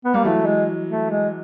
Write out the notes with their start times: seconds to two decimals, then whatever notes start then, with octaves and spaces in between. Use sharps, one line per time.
0.05 B3
0.14 G3 A#3
0.24 E3 F#3 A3
0.46 G#3
0.89 A3
1.10 G#3